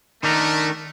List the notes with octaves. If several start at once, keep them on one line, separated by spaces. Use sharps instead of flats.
D#3 A3 D4 A#4